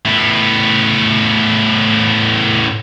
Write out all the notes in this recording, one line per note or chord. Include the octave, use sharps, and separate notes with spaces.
A2 B3